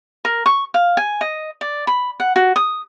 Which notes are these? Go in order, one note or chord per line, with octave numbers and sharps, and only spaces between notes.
A#4
C#6
F5
G#5
D#5
D5
B5
F#5
F#4
D#6